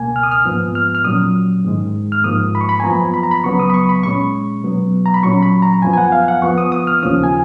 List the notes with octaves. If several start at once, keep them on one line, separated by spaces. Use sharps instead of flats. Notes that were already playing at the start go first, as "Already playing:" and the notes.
Already playing: C#2 B2 A#3 G#5
F6
D#6
F6
G#2 F3 B3
F6
F6
A#2 F#3 C#4 D#6
G#2 D#3 G#3
F6
G#2 F3 A#3 D#6
B5
C#6
B5
G#5
F#2 F3 B3 A#5
B5
A#5
B5
C#2 C#3 F#3 B3 C#6
D#6
B5
C#6
B5
A#2 G#3 C#4 C#6
B2 F#3 B3
A#5
B5
A#2 F#3 C#4 C#6
B5
A#5
F#2 F3 B3 G#5
G#5
F#5
F5
F#5
F2 F3 B3 C#6
D#6
D#6
F6
D#2 C#3 F3 A#3 C#4 D#6
G#5